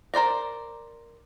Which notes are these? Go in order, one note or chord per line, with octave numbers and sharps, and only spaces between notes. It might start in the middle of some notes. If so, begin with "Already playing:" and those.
A#4 C5 D5 A#5